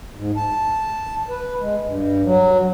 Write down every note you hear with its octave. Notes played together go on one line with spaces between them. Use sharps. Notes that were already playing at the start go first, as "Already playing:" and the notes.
G#2
A5
B4
G#3
G2
F#3